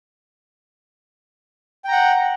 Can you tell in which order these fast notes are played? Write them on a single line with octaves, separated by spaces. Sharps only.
G5 A#5 F#5